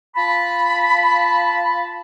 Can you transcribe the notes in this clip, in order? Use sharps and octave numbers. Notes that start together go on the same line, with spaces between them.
F4 A5 B5